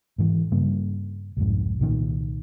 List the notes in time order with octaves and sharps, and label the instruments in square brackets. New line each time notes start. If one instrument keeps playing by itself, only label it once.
[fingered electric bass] G#2 E3
G2 C#3 G3 A#3
C2 F2 G#2
C2 A#2 D#3